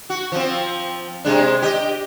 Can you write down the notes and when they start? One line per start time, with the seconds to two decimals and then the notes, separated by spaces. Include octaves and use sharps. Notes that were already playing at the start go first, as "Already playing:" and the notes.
0.10 F#4
0.32 F3 C4
1.25 C3 G#3 D4
1.62 G4 D#5